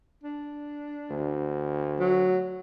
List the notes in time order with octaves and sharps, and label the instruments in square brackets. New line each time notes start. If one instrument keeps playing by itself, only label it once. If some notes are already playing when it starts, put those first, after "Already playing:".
[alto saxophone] D4
[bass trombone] D2
[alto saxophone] F#3